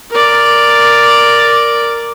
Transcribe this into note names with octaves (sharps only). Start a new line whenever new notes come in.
A#4 D5